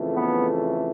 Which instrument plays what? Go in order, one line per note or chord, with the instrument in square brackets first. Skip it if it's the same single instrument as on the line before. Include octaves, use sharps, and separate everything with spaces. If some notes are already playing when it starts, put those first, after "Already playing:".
Already playing: [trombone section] F2 C#3 E3 A3
B3